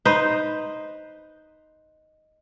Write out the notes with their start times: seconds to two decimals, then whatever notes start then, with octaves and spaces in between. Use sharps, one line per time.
0.05 D#4 B4 C5